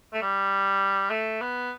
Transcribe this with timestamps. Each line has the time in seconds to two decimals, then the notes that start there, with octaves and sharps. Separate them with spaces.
0.13 A3
0.22 G3
1.10 A3
1.41 B3